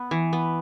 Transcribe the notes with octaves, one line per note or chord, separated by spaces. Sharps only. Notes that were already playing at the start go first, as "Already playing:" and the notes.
Already playing: B3
E3
B3